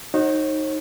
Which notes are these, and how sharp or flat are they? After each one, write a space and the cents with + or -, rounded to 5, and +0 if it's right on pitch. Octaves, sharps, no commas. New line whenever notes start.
D#4 +0 F#4 +0 C#5 -45